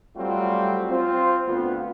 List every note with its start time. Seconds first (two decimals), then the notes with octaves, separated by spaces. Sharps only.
0.17 F#3 G3 A3 C4 F4 F#4
0.90 C4 F4 C5
1.46 D2 B3 F4